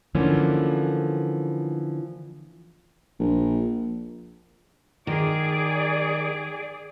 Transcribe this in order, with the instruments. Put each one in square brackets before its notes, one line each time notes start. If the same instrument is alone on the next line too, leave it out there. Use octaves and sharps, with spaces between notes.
[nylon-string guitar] D3 E3 F3 A3 A#3 C#4
[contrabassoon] A#1
[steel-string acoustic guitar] D#3 [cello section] G#4 D5